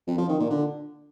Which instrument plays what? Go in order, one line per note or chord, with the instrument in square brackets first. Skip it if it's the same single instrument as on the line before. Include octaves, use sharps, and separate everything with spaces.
[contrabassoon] F2
F3
D#3
A#2
D3